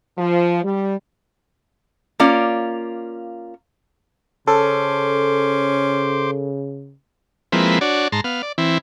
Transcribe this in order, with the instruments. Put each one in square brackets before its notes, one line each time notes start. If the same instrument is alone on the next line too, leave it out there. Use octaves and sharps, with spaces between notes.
[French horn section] F3
G3
[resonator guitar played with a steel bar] A#3 C#4 F4 D5
[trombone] C#3 [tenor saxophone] C#4 [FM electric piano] A4 [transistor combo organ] C5 C6 D6
[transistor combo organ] F3 G#3 A#3 C4 E4 B4
D4 F#4 C#5 D5
G#2 A5 A#5 C6
B3 F5
D5
E3 C4 E4